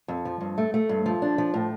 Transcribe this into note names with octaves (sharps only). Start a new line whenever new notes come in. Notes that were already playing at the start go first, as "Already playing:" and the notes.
F2
F3
G2
A3
A3
G2
F3
D4
F3
A2